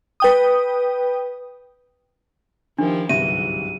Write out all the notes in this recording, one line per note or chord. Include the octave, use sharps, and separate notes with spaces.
B4 G5 D#6
D#3 F3 D4 E4 G4 A#4
G1 C2 G#2 E3 F#3 E5 D#7